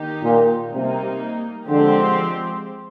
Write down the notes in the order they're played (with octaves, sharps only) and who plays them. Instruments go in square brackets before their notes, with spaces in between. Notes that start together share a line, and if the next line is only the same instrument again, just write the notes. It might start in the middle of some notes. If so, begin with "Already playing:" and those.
Already playing: [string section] D#3 A#3 D#4 G4
[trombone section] A#2
[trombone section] C3 [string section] G3 A#3 D#4
[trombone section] D3 [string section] F3 G#3 C4 G4